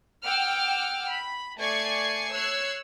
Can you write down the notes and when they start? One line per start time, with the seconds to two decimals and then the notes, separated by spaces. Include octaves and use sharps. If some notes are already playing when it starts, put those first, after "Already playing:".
0.25 F#5 G5 D6 E6 F6
1.10 B5
1.57 A3 D5 G#5 C#6 G#6 C7
2.33 C#5 E6 F#6 G#6 C7